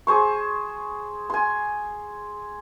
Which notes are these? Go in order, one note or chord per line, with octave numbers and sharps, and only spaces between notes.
G#4 C5 C#6
G#5 C6